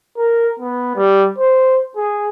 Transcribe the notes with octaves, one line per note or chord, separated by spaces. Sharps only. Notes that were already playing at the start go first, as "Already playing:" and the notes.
A#4
B3
G3
C5
G#4